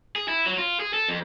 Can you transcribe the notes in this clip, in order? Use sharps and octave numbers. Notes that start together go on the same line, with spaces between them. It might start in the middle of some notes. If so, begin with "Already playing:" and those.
G#4
E4
F#3
F4
G#4
A4
F2